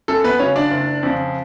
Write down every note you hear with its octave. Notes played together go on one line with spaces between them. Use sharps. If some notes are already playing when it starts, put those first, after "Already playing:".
F#2 A4
B3 B4
C#3 F#3 C#4 C#5
D4 D5
F#1
F2 C#3